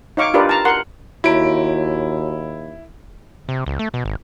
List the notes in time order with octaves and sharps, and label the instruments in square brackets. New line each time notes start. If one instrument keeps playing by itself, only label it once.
[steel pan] D#4 C#5 F5 C#6 D6
D4 F4 G4 A#4 B4 D5
A5 A#5
A#4 F#5 C6
[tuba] D#2 [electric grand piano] E4 D7 [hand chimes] F#4 C#5 A#5
[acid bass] C3
C#2
A3
B2
G#1